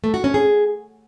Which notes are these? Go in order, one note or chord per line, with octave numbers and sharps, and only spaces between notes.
A3
F#4
C#4
G#4